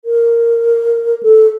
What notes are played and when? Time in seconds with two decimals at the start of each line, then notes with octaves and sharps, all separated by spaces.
0.05 A#4
1.23 A4